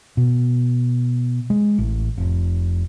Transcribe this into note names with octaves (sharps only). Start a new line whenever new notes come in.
B2
G#3
A1
F1